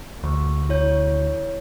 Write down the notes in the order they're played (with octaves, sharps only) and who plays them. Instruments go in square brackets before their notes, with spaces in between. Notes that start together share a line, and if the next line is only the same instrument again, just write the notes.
[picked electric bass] D2
[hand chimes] E4 C#5 G6